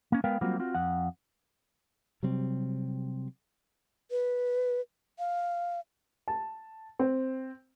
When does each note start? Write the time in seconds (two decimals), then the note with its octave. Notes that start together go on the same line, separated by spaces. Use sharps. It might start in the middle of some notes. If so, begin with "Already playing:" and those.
0.12 A#3 C#4
0.24 G#3 B3 A#4 B4 F5 G5
0.41 F#3 G3 A#3 C4 F4 F#4
0.59 C4 F4 F#4
0.74 F2 F#5
2.23 C3 F#3 G3 C4
4.11 B4
5.19 F5
6.28 A5
6.99 C4